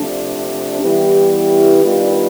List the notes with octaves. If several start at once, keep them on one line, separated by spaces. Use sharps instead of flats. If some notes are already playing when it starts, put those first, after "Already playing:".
Already playing: C3 F3 A3 D4
E3 G3 B3 E4 G4
D#3 G3 B3 D4 F4